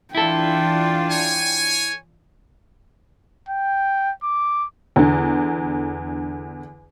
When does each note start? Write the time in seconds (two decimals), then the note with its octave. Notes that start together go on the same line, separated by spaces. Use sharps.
0.15 E3 D4 E4 F4 A4 G5
1.10 C#5 G#5
3.49 G5
4.23 D6
4.96 E2 D3